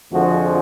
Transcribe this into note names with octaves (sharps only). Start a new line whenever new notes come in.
F2 D3 F3 G#3 F#4